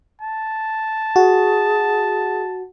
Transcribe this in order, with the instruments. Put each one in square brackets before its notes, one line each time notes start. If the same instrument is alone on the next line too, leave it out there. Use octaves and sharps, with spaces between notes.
[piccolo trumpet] A5
[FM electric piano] F#4 [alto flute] G#4